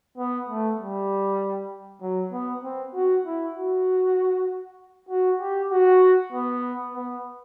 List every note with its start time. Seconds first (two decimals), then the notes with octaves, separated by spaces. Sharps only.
0.18 B3
0.49 A3
0.80 G3
2.01 F#3
2.32 B3
2.63 C4
2.95 F#4
3.26 E4
3.56 F#4
5.09 F#4
5.40 G4
5.72 F#4
6.32 B3
6.94 B3